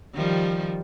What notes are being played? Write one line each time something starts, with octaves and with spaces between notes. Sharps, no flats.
D#3 F3 G3